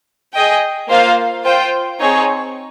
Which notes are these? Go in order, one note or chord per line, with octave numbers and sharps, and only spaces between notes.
G#4 D#5 G5
A#3 F4 C5 F5
F4 C5 G5
C4 D#4 G#4 C#5